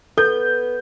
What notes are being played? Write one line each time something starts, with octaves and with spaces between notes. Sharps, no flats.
B3 A4 G6